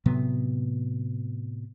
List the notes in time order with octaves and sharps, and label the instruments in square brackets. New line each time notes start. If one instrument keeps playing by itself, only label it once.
[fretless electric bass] A2 C3 F#3 B3